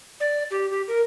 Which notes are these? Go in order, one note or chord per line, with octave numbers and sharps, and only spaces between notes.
D5
G4
G4
A#4